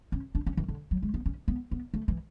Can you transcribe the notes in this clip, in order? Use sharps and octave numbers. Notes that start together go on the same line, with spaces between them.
C#4
D4
C#4
E3
D3
F#3
G#3
B3
C#4
B3
B3
A3
E3